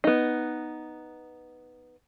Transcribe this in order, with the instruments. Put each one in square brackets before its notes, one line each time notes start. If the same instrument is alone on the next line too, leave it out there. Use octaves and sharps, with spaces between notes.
[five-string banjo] B3 D#4